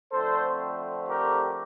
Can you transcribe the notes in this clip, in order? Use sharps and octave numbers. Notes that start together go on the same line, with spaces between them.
F2 D3 A3 C4 A4 C5
G4 A#4